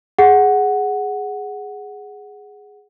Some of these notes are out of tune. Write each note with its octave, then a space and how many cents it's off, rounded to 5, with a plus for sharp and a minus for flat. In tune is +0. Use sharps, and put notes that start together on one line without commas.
G#4 +0 F#5 +0